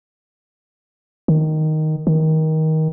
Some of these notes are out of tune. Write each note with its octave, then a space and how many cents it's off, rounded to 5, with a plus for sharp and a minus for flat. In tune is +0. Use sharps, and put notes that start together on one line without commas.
D#3 +0
D#3 +20